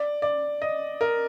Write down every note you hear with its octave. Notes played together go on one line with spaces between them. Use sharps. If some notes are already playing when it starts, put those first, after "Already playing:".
Already playing: D5
D5
D#5
A#4